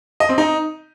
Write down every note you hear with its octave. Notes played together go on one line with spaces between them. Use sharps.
D#5
C4
D#4